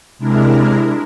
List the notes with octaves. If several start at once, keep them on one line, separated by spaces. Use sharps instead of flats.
C3 G#3 D4 E4 A#4